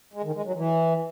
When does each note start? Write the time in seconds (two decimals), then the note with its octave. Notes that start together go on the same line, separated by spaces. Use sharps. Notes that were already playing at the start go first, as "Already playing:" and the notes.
0.13 G#3
0.24 D#3
0.34 G#3
0.45 F#3
0.55 E3